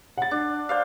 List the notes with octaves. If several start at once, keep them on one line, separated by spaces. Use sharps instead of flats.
F#5 A6
D4
C5 D5 F5